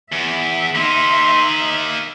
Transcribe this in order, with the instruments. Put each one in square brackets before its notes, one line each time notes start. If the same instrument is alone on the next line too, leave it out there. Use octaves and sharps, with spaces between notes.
[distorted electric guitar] E2 [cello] E5
[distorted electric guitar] A#3 D#4 [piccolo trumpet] C6